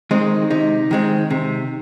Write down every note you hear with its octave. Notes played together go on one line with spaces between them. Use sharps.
D#3 G#3 C4 D#4
C3 D#4
D#3 G#3 C4
C3